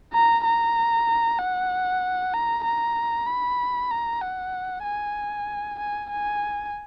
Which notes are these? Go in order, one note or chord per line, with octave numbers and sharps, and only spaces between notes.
A#5
A#5
F#5
A#5
A#5
B5
A#5
F#5
G#5
G#5
G#5